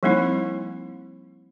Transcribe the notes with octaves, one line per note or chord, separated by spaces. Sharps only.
F3 G3 A#3 C4 D#4 E4